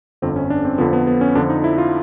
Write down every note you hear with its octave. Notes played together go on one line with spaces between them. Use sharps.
G1 F2 D3 F3 C4
C#4
D4
C4
F2 D3 F3 B3
B3
B3
C#4
F2 D3 F3 D4
D#4
E4
F4